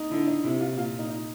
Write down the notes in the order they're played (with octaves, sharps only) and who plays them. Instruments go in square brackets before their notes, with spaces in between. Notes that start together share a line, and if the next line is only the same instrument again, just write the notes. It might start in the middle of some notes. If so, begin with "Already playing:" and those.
Already playing: [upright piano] D#4
[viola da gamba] D3 [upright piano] E4
[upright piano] D#4
[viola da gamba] C3 [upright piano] E4
[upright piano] F4
[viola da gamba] A#2 [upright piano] F4
[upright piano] D#4
D#4